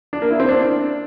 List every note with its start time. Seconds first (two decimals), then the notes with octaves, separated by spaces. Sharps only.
0.13 D4
0.22 A#3
0.31 E4
0.40 C4
0.48 D4